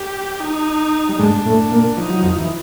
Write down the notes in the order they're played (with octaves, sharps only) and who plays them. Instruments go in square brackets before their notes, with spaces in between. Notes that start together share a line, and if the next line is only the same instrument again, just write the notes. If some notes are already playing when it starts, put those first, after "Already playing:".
Already playing: [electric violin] G4
D#4
[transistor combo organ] G3
[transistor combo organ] G#2 G#3 [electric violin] D4
[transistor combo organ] A2 A3
A#2 A#3
[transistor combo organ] F3 [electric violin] D#4
[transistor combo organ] F#3
F2 F3
E3